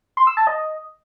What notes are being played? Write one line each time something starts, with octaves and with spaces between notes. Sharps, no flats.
C6
E6
A5
D#5